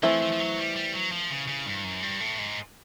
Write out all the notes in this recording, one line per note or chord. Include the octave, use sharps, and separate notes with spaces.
E3 F3 A3 C4 E4
F3
F3
F#3
G3
G3
F#3
F3
C#3
C#3
G2
F#2
G2
A2
G#2